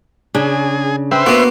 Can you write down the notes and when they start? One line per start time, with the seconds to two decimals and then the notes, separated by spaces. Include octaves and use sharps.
0.35 C#3 D4 G#4
1.11 C4 B4 C5 E5
1.26 A#3 B3 F#4